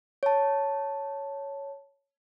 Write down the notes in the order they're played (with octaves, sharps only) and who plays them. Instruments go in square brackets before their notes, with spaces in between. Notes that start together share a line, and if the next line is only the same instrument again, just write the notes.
[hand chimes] C#5 A5